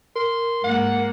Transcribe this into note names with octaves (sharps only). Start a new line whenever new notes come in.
A#4 C6
G#2 A#3 F#5